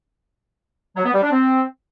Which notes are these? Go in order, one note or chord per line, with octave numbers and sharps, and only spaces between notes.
F#3
B3
G3
D4
C4